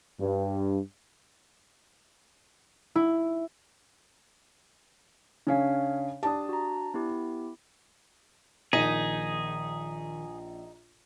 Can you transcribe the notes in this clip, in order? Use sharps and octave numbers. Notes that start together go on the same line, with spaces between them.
G2
E4
C#3 C#4 D4 C#5 F5
D4 G4 A5 D#6
F#4 A#5
B3 E4 G4
A#1 D#3 D#4 G#4 B6